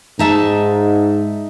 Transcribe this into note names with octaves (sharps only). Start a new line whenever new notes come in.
G#2 D#4 E5 A5